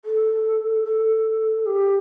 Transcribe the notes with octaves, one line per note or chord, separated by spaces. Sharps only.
A4
A4
G4